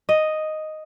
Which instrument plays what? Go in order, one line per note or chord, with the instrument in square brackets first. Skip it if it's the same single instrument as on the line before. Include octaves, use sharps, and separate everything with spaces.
[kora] D#5